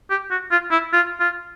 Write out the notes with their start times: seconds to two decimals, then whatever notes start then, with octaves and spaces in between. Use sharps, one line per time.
0.10 G4
0.31 F#4
0.51 F4
0.71 E4
0.93 F4
1.20 F4